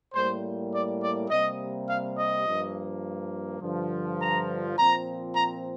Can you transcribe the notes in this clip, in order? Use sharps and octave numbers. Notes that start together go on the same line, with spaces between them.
A2 G3 A#3 C5
D5
D5
C3 G3 A#3 D#5
F5
D#5
G2 F3 A#3
G2 D3 F3
A#5
A#2 F3 C4 A#5
A#5